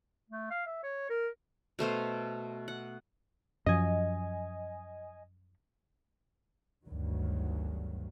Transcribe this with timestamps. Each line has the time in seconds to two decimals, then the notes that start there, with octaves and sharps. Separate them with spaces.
0.30 A3
0.50 F5
0.66 E5
0.83 C#5
1.10 A#4
1.79 B2 A3 C5 F5
2.68 F#5
3.66 F#2 F3 D#5 G#5
6.87 G1 D2 G2 D#3 F#3